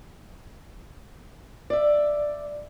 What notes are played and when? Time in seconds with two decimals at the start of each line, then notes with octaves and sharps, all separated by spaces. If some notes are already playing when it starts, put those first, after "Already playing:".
1.70 D5 E5